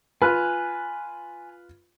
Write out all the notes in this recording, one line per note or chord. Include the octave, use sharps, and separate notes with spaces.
F4 B4 G#5 F6 F#6